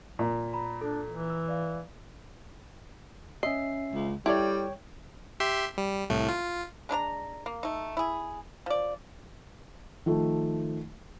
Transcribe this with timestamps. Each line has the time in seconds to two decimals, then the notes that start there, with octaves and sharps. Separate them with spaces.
0.19 A#2
0.53 A#5 B5
0.81 D4 A4
1.08 E3
1.30 E6
1.48 D5 F5
3.43 C#4 D#5 E5 C7
3.94 C#2
4.26 G3 E4 A4 C#5 D5 G5
5.40 G4 E5 C6
5.78 G3
6.10 C2 A2 A3
6.28 F4
6.89 G#3 D4 A#4 A#5
7.46 A#3
7.63 A3 D#4
7.97 E4 G#4
8.66 F3 D5
10.06 D#3 F3 A3